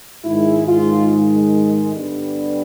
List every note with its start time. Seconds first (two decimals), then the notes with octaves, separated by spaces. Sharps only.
0.25 G#2 D#3 G#3 E4
0.67 F4
1.94 G2 D3 G3 B3